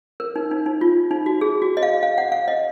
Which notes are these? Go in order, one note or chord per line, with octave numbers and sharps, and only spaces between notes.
A#4
D#4
D#4
D#4
F4
D#4
F#4
G#4
F#4
D#5
F5
F5
F#5
F5
D#5